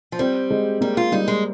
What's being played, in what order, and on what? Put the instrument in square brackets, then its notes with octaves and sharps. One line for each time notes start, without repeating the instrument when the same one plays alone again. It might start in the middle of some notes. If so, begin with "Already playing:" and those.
[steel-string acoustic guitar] F3
[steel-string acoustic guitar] G3 [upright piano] C4
[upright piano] G#3
[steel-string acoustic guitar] G3 [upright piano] A#3
[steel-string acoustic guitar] F4
[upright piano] G3 [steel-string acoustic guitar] D#4
[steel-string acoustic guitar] G#3